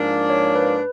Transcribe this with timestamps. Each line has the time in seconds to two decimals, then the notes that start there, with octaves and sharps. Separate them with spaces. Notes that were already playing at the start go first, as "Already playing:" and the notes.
Already playing: G#2 F3 A#3 D4
0.30 C#5
0.56 B4